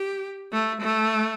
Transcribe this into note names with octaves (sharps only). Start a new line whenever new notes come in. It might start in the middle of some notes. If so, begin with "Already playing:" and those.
Already playing: G4
A3
A3